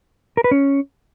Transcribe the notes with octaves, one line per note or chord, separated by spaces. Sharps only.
A#4
B4
C#4